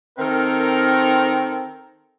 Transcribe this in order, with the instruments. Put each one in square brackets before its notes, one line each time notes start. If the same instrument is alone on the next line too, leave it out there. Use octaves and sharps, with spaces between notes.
[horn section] D#3 C4 A4 A#4